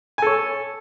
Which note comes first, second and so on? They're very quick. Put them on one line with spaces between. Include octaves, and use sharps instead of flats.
G#5 A4 C#5